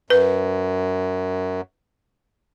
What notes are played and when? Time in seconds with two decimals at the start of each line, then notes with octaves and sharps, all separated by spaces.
0.10 F#2 B4